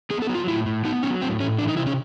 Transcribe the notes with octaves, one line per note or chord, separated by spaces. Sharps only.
B3 G#4
A4
F#3
F4
A2 E4
A2
B3 D#4
F#3 C#4
A2 C4
A2 C#4
E3 D4
D#4
C3 E4
C#4